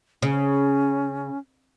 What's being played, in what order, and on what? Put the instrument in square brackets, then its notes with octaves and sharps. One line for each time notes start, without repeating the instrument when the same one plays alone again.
[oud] C#3 [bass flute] C#4